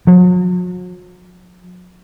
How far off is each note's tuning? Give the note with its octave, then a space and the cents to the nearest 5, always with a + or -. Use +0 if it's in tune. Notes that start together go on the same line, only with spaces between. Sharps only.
F#3 -45